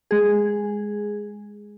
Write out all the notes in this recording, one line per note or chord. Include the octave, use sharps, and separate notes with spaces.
G#3 G#4